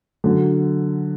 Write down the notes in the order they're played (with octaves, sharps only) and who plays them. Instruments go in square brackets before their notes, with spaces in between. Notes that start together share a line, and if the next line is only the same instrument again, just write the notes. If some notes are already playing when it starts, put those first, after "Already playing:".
[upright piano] D3 F#3